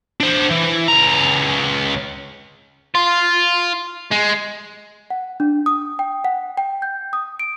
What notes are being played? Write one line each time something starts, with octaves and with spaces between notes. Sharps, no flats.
D4 C5
E3
C#2 A#5
F4
G#3
F#5
D4
D#6
G5
F#5
G5
G6
D#6
D7